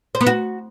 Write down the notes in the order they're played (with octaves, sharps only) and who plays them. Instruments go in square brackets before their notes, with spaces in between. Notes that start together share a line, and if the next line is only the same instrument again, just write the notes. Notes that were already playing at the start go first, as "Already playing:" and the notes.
[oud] C5
B3
F#4